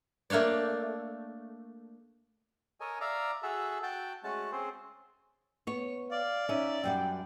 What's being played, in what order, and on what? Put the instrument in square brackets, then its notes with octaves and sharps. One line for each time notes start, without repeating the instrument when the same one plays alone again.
[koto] A3 A#3 D4 C#5 D5
[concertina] A4 A#4 C#5 D#5 G#5
D5 E5 F5 A#5
F#4 G#4 A4 E5
F#4 G5 A5
G#3 A3 C#4 F#4 A5
C4 C#4 G#4 C5
[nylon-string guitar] B3 C#5
[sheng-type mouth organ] D5 [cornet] F5
[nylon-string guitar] C#4 D#4 [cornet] E5
[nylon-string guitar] F#2 G3 F#5 [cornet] G5